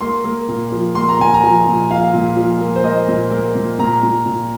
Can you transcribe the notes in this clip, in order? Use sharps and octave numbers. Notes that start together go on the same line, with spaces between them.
A#3 C6
A#3
A#2
F3
A#3 C6
A#5
A#2 G#5
A#5
F3
A#2
F3 F5
A#2
F3
A#3
C5
A#3 D#5
A#2
A#3
A#2
A#2 A#5
A#2
A#2